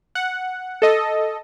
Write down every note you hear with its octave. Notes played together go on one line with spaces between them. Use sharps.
F#5
A4 D#5